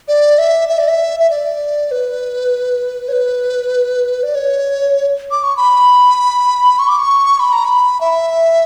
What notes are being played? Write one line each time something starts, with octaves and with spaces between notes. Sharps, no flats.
D5
E5
E5
D5
E5
E5
D5
B4
C#5
B4
D5
C#5
D6
C#6
B5
C#6
D6
C#6
B5
A#5
B5
E5